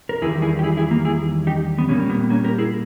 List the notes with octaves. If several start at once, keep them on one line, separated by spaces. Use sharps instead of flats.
A#4
E2 D#3 G3 E4 G#4
E4 G#4
G4
E4 G#4
E4 G#4
A#3
E4 G#4
D#4 G4
B3
A#2 G3 A#3 C#4
B3
A#3 C#4
G4 A#4
E4 G#4